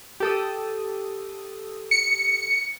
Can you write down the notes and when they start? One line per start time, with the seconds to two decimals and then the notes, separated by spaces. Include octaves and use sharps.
0.20 G4 A4 D#6
1.91 C#7